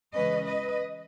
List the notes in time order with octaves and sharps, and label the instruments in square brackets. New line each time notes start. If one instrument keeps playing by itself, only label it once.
[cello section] C#3 E3 G#3 C#4 B4 D#5
B4 D#5